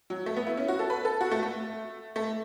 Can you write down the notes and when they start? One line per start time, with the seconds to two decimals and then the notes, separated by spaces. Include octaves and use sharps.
0.10 F#3
0.26 A3
0.36 B3
0.46 E4
0.57 C#4
0.68 F#4
0.79 A4
0.90 B4
1.05 A4
1.21 F#4
1.31 A3
1.43 A3
2.16 A3